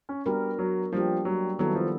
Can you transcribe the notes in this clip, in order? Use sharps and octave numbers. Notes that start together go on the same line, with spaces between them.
C#4
G3 B3 D4 F#4 A#4
F#3
F3 G3 A#3 D4 G4
F#3
D#3 F#3 G3 B3 E4 A4
F3